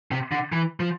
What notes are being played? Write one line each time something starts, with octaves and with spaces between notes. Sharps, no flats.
C3
D3
E3
F3